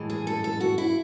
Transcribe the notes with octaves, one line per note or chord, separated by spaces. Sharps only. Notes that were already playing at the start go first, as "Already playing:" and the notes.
Already playing: A2 E3 G#3
G#4
A4
A4
F#4
E4